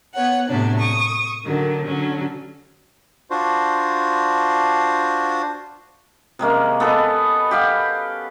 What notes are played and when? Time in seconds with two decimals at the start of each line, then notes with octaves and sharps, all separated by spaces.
0.13 B3 C#5 F#5
0.49 A2 C3 F#3 B3 D4
0.79 C#6 D#6
1.45 D3 D#3 F#3
1.84 D3 F#3 C#4 D4
3.30 D4 F4 F#4 C5
6.39 C3 G#3 A#3 C#4
6.80 B3 A4 B4 D#5
7.51 G4 F5 F#5